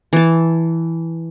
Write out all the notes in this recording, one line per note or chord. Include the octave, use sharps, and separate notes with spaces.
E3 A5